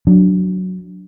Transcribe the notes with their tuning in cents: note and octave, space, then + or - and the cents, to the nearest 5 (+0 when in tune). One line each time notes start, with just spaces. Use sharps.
F#3 +0 D4 -10